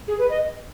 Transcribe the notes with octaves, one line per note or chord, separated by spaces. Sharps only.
G#4
B4
D#5